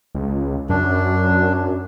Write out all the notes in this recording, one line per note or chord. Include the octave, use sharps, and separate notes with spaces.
C#2
F#2 D4
F#2